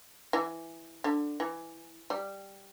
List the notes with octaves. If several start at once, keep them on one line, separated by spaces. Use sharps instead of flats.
E3
D3
E3
G3